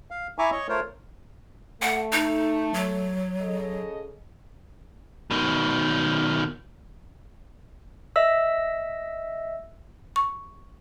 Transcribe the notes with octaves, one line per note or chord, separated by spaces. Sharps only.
F5
E4 E5 G#5 A#5 C#6 D6
C#5 D#5 C#6
A3 F4 A#4 C5 C#5
A3 F#5
D#4
F#3
C#3 A4 D#5
B2 D#3
D#5 E5 E6
C#6